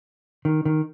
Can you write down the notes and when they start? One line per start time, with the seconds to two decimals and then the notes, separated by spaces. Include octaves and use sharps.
0.45 D#3
0.65 D#3